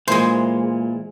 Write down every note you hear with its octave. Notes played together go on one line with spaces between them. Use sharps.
A#2 E3 G#3 C5